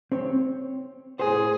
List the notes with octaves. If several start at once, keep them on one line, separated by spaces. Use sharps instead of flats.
C4 C#5
A2 G#4 A#4 C5